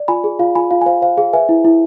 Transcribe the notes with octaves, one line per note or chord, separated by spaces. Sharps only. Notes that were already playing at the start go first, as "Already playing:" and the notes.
Already playing: D5
F4 G#5 B5
G#4
F4 F5
F4 G#5 B5
F4 F5
G#5
C5 F5
C5 F5
G#4 F5
B4 E5 G#5
E4
E4